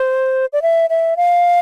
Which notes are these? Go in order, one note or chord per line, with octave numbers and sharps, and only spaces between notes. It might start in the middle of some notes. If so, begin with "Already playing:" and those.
Already playing: C5
D5
E5
E5
F5